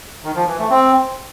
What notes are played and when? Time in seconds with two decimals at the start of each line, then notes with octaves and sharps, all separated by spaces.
0.24 D#3
0.36 F3
0.47 E3
0.59 A3
0.70 C4